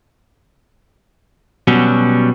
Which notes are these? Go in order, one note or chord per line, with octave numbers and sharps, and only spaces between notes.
B2 F#3 G3 C#4